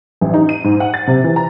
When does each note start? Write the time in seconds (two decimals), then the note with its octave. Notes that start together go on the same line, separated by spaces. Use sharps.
0.21 A1
0.34 D#4
0.49 D#7
0.64 G#2
0.80 F#5
0.94 A6
1.07 C3
1.24 E3
1.36 A#5